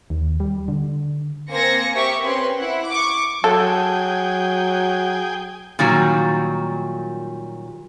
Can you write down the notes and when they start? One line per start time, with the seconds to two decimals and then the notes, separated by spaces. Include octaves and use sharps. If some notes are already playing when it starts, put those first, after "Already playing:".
0.10 D#2
0.40 G3
0.68 D3
1.50 A#3 C4 C5 G#5 A#6 C#7
1.94 G4 A#4 E5 C#6
2.23 C4 C#4 B4 C6
2.57 E4 F#5
2.90 C#6 D6
3.44 F#3 G#4 A4 G5
5.79 A#2 D#3 F#3 G3